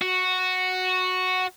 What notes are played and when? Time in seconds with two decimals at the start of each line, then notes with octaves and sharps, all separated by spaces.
0.02 F#4